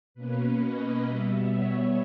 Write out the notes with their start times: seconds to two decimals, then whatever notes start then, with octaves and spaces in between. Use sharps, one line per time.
0.14 B2 A#3 C#4 B4
0.59 D#5
1.04 B2 G3 B3 E5
1.49 C#5